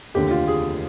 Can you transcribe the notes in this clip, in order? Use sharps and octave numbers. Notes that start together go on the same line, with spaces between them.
F1 D#2 D3 G4
F4
G#4